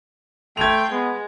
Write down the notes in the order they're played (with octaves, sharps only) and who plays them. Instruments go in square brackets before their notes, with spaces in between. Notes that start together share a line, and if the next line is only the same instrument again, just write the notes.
[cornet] A3 [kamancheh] G5 C6 [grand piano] G#6 F7
[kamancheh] G#3 [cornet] B3